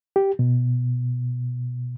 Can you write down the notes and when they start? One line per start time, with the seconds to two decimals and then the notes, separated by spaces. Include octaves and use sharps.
0.16 G4
0.39 B2